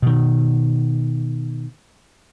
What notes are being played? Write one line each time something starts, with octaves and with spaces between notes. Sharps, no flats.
B2 D#3